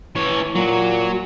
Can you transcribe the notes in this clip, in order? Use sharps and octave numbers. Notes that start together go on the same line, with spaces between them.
E3 C#5
A#2 F#3